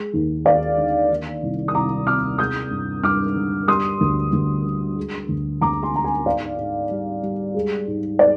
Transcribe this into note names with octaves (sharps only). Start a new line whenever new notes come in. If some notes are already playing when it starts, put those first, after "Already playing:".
Already playing: G#3
D#2
D#2 D5 F5
D3
D#3
C2
D#6
C2 A#5 D6
C3 D6 F6
G#3 D#6 G6
G2
G2 D6 F6
D3
G3 C6 D#6
D2
D2
D3
G#3
D2
D2 A#5 D6
G#5 C6
D3 A#5
G#5 C6
G#2 D5 F5
G#2
G3
G3
G#3
G#2
D5